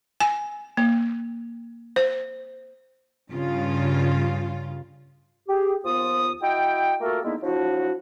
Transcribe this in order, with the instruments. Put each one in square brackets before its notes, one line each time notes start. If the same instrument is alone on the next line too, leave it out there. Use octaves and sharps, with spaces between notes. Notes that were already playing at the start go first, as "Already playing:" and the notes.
[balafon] G#5
A#3
C5
[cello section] G2 C#3 F4
[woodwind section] G4 G#4
D#2 F3 B3 F4 D#6
E4 F#4 D#5 G5
A3 A#3 F4 F#4 A4 A#4
D3 G#3 A#3 B3 D#4 E4
F3 F#3 D4 E4 F#4